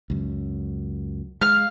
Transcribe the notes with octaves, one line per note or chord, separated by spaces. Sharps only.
C#2 F#2
G#3 F5 F6